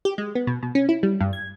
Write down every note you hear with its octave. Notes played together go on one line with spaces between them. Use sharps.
G4
G#3
B3
B2
B2
C#4
E4
G3
G2
G#6